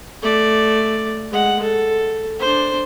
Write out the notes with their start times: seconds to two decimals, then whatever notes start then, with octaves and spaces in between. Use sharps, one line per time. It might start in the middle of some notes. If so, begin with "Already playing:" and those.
0.22 A3 D5
1.31 G#3 F#5
1.63 A4
2.40 D4 C5